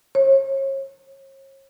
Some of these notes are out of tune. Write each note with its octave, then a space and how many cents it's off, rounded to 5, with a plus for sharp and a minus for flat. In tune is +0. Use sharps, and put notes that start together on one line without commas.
C#5 -40